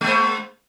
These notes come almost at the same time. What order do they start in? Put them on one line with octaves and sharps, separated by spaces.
G#3 A#3 C5